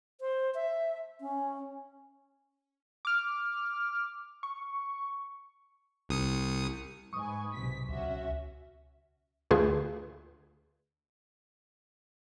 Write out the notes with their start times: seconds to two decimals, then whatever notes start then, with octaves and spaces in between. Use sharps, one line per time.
0.21 C5
0.55 E5
1.21 C#4
3.05 D6 F6
4.43 C#6
6.09 C2 D#6 C#7
7.13 G#2 B4 G#5 C#6 D#6
7.54 B1 C3 B6
7.89 C#2 C#4 F#4 E5
9.51 D2 F4 G#4 B4 G#5